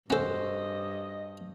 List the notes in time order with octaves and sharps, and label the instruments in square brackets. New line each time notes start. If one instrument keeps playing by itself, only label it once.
[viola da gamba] G2 [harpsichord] C#4 A4 [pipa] F#4 C5 [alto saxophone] D#5